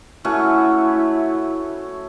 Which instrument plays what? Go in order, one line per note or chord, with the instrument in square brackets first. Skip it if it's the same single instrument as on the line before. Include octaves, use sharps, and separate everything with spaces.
[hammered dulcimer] A3 C#4 F#4 [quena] E4